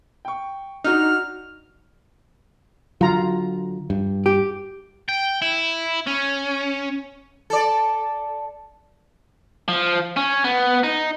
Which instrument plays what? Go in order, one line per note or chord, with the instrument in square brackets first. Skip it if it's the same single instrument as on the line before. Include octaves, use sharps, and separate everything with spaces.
[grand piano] G5 C#6
[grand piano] D4 F#4 [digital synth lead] D#4 [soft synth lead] F6
[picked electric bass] D3 F#3 [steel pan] F4 A#5
[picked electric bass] G2
[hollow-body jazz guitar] G4
[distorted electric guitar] G5
E4
C#4
[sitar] A4 D5
[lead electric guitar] F3
C#4
B3
D#4